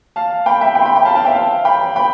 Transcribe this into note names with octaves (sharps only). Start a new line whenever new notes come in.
F5 A5
G5 B5
E5 G5
G5 B5
C6
G5 B5
G5 B5
F5 A5
F5 A5
E5 G5
F5
G5 B5
G5 B5